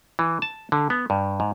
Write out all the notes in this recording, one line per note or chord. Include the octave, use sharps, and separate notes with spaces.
E3
A5
D3
B3
G2
G#2